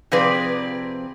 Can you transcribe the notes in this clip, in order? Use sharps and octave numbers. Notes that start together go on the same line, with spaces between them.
C3 F3 C4 G#4 B4 D5